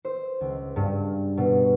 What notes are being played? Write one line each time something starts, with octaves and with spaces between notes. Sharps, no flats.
C5
C#2
G2
B2